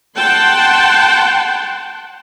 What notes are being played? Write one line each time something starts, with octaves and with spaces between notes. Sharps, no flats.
F#5 G5 A5 C6